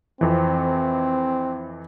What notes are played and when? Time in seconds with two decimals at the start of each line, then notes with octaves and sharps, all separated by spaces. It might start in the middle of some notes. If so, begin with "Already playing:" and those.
0.21 F2 E3 C4